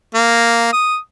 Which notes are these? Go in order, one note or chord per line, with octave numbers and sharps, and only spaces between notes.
A#3
D#6